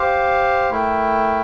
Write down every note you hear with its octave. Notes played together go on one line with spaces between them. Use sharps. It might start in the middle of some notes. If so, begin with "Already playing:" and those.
Already playing: G4 C5 F5
A3 E4 A#4 E5 G5